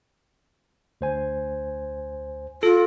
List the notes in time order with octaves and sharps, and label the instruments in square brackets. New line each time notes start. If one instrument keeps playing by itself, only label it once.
[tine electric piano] D2 C5 G#5
[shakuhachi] F4 [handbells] A4